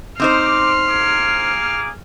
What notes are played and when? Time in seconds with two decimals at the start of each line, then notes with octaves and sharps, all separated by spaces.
0.20 C4 D#4 C5 D6 F6 C7
0.88 A#3 G#4 D6